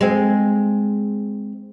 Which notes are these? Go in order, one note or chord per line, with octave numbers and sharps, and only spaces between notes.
G#3 C4